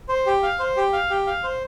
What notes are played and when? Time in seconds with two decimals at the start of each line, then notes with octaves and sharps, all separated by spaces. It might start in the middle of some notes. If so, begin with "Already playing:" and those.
0.09 C5
0.26 G4
0.43 F5
0.59 C5
0.77 G4
0.93 F5
1.10 G4
1.27 F5
1.44 C5